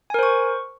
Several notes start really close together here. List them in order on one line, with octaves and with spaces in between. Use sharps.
G#5 A#4 C5 C#6